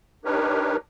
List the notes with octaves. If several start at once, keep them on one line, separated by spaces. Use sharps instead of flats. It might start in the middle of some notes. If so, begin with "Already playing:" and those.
D4 D#4 G4 A#4 B4 C#5